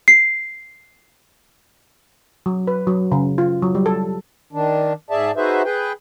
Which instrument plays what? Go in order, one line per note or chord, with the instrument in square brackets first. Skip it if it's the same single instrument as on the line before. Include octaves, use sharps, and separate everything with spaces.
[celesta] C7
[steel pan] F#3
B4
F#3
C#3
F4
F#3
G3
A4
[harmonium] D#3 D4
G#2 G#4 D5 E5 A5
D#4 F#4 G#4 B4 C5 E5
G#4 B4 G5